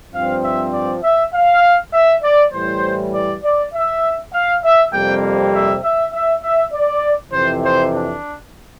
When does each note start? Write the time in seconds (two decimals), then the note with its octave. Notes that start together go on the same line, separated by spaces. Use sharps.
0.12 G2 F3 C4 F5
0.42 E5
0.73 D5
1.03 E5
1.33 F5
1.93 E5
2.23 D5
2.53 A2 E3 G3 C5
3.12 D5
3.43 D5
3.73 E5
4.33 F5
4.63 E5
4.93 F2 C3 G3 A#3 G5
5.52 E5
5.83 E5
6.12 E5
6.43 E5
6.72 D5
7.33 F2 C3 E3 C5
7.63 C5
7.92 D4